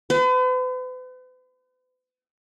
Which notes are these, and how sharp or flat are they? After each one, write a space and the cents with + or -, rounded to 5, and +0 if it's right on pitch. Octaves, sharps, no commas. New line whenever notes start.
B4 +45